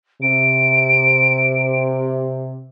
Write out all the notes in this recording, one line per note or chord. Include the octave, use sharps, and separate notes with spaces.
C3 D7